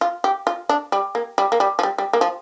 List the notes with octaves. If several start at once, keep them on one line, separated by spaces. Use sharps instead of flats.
F4
G4
F4
D4
G3
A#3
G3
A#3
G3
F3
G3
G3
A#3
F3